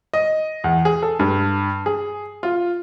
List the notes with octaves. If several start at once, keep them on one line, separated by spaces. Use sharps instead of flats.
D#5
E2
G#4
A4
G2
G#4
F4